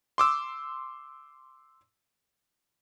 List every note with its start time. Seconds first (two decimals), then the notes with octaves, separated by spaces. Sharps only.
0.18 C6 D6 E6